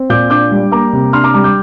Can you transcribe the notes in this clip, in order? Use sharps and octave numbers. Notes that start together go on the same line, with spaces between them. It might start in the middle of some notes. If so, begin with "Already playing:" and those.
Already playing: C4
A#2 D6 G6
D4 D6 G6
G3
A#3 A#5 D6
C3
D4 C6 F6
A#5 D6
G3 A#5 D6
D6 G6